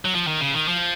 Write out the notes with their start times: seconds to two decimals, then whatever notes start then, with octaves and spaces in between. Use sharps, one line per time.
0.05 F#3
0.15 F3
0.28 D#3
0.41 C#3
0.54 D#3
0.68 F3